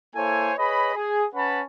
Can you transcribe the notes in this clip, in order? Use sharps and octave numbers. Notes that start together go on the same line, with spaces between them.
A#3 E4 A4 C5 C#5 G#5
G#4 B4 C#5 D#5 B5
G#4
C#4 B4 F#5 A5 B5